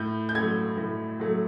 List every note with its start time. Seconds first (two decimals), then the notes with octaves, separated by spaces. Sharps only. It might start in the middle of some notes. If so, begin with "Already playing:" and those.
Already playing: A2 G6
0.29 G6
0.35 F#3 A3 G#6
0.77 A2
1.20 F#3 A3